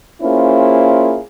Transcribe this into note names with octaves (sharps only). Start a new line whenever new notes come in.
A#3 C#4 E4 F4 G#4 C5